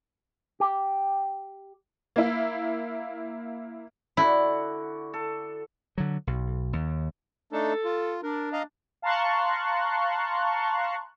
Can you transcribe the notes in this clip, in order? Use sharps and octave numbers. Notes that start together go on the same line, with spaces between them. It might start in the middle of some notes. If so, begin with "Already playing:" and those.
G4
A#3 E4
D3 E4 F#4
A4
D3 F#3
B1
D#2
A3 D4 D#4 A4
F4
D4 A#4
D#5 F5 A#5
F5 A5 A#5 C6 C#6 F#6